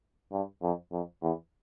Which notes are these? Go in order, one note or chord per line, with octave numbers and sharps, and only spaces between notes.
G2
F2
F2
E2